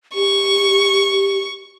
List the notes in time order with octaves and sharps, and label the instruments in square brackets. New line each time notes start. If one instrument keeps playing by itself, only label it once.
[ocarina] G4 [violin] C#6